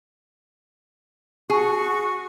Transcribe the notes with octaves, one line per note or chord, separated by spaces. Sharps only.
F#4 G#4 C#6